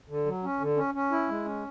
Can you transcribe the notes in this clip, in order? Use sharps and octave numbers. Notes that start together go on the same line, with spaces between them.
D3
F#3
C#4
D3
C#4
C#4
E4
G#3
C#4